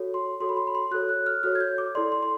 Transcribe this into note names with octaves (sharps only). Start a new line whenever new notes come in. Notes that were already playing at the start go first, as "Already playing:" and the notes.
Already playing: F#4 A4 C#5
C6
F#4 A4 C#5 C6
B5
C6
B5
C6
F#4 A4 C#5 F#6
F#6
F6
F#4 A4 C#5 F6
G#6
G6
D6
E4 A4 D5 C6
C6
C6